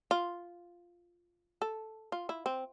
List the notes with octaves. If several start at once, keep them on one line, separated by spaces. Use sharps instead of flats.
F4
A4
F4
E4
C4